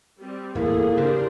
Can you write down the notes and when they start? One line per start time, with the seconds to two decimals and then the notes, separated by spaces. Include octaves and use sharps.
0.19 G3 C4
0.55 D1 G1 E2 A3 A#3 E4 G#4 A4
0.97 G2 C#3 D4 G4 A#4 C5